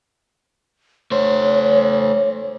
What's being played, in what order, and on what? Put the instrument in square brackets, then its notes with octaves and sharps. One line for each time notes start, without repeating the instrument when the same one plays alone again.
[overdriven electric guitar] A3 C5 [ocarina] C#5